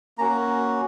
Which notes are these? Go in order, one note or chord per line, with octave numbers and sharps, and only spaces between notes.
A#3 C#4 F#4 A#5